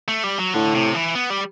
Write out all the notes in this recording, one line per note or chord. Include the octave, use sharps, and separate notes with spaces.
A3
G3
F#3
A2 D3
C3
E3
B3
G3